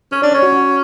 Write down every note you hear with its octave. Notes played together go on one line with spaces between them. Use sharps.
C#4 C#5
D4 D5
C#5
C#4
F#4
F#4